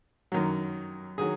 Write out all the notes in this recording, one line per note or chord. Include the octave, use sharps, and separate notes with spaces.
F#2 D#3 F#3
D#3 F#3 G#4